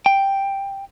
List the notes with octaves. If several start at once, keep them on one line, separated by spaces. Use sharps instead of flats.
G5